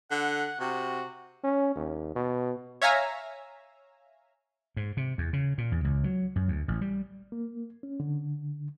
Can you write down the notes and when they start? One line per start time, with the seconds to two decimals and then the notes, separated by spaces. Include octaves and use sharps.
0.11 D3 F#5
0.60 C3 F#4
1.44 C#4
1.76 D#2
2.15 B2
2.82 C#5 E5 F5 G#5 A#5
4.77 G#2
4.97 C3
5.18 E2
5.33 C#3
5.58 A#2
5.72 E2
5.84 C#2
6.04 F#3
6.36 F#2
6.48 D2
6.68 A1
6.81 G3
7.32 A#3
7.83 C#4
8.00 D3